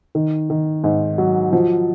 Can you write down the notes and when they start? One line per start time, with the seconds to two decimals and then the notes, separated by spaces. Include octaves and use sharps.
0.15 D#3
0.50 D#3
0.84 G#2
1.18 F#3
1.53 F3